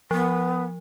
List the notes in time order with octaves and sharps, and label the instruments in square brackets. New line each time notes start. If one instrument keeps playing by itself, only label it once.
[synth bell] F3 [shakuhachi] B3